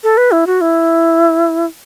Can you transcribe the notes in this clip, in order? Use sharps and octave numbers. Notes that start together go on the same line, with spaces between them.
A4
B4
E4
F#4
E4